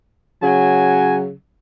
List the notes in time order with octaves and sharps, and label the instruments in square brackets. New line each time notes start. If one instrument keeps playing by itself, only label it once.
[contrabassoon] C#3 [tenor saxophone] F#3 [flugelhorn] G#5